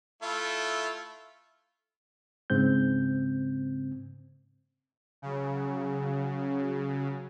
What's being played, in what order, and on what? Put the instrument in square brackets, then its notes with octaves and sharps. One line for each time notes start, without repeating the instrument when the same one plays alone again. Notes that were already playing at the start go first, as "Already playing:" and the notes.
[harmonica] A3 E4 F4
[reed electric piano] G#2 C#3 C4 G6
[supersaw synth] C#3 [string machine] F#3